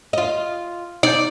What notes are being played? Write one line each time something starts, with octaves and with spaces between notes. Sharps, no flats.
F4 D#5
D#4 D5 G6